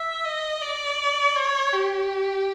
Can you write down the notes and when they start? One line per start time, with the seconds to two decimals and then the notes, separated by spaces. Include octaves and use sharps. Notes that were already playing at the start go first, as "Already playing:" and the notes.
Already playing: E5
0.24 D#5
0.62 D5
1.36 C#5
1.72 G4